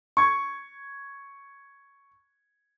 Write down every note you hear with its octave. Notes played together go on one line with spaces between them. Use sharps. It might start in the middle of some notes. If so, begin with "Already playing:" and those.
C#6 G#6